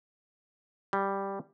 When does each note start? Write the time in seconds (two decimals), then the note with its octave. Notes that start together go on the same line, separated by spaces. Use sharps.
0.93 G3